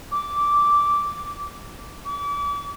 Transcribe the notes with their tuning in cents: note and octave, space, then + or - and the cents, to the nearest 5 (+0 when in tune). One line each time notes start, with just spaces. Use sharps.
D6 -10
D6 -40